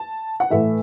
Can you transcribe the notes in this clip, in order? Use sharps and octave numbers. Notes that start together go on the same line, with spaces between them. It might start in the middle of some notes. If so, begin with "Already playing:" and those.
Already playing: A5
F#5
A2 E3 A3 E5